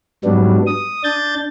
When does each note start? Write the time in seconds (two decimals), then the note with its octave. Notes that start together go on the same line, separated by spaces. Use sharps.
0.25 G#2 F#3 G3 B3 D4
0.67 D#6
1.04 D4 G6 A6